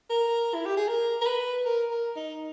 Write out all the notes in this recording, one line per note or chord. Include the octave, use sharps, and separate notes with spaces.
A#4
E4
G4
G#4
A#4
A#4
B4
A#4
A#4
D#4